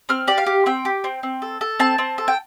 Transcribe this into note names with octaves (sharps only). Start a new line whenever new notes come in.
C4 F6
G4 D5
F5
G4
C4 G5
G4
C4
C4
A4
A4
C4 A5
C4
A4
G5